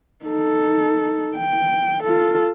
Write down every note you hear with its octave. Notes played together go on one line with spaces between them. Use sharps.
D#4 A4
G5
F4 A4